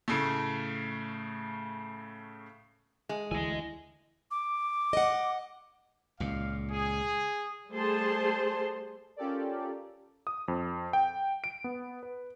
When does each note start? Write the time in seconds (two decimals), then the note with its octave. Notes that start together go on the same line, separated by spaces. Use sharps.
0.08 A2 C#3 A3
3.09 G#3 G#5
3.31 D2 E3 E4 D#5 G#5
4.31 D6
4.93 D#5 F#5
6.20 C#2 A#2 F5
6.72 G#4
7.71 G3 A3 G#4 C5 A5 C6
9.16 C#4 F4 G4 A4 A#4 D5
10.27 D#6
10.48 F2
10.93 G5
11.44 D7
11.64 B3
12.03 B4